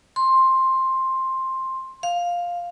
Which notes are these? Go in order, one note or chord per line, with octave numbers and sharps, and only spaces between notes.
C6
F5